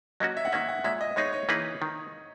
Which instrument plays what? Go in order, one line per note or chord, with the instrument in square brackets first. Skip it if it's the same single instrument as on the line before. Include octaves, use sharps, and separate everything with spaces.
[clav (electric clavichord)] F#3 A#3 C#4 F#4 [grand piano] D#5
[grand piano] E5
F#5
[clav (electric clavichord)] D#3 A#3 C#4 [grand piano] E5
[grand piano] F#5
[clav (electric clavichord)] A#2 G#3 C#4 [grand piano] E5
[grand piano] D#5
[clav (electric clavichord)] G#3 B3 D#4 G#4 [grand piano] C#5
[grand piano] C#5
[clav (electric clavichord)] E3 A#3 D#4 G#4 B4
D#3